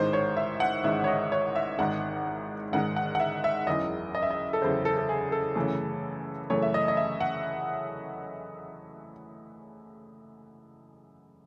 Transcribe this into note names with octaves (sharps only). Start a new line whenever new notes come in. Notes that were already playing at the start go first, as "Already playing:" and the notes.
Already playing: A1 G#2 D#3 C5
C#5
E5
F#5
A1 G#2 D#3 E5
C#5
D#5
C#5
E5
G#1 G#2 D#3 G#3 F#5
G#1 G#2 D#3 G#3 F#5
F#5
F#5
E5
E5
F#1 E2 C#3 D#5
D#5
E5
D#5
A4
F#1 E2 C#3 C5
A4
A4
G#4
A4
F#2 C#3 E3 A3
F#2 C#3 E3 A3 C#5
E5
D#5
D#5
E5
F#5